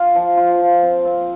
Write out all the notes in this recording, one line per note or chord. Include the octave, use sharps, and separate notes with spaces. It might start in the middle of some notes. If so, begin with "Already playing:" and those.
Already playing: F4
F3
F4
F3
C4
C4